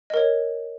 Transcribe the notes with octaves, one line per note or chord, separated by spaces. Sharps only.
A#4 C#5 D#5